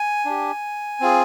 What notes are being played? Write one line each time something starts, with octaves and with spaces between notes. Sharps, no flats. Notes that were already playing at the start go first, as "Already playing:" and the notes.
Already playing: G#5
D4 G4
C4 F4 G#4